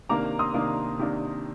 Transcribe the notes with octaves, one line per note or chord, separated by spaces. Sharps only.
C3 D#3 A#3 D4 A#5 D6
C6 D#6
C3 D#3 A#3 D4
C3 D#3 A#3 D4